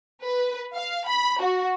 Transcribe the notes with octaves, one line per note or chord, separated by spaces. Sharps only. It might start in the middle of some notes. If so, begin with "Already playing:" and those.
B4
F5
B5
F#4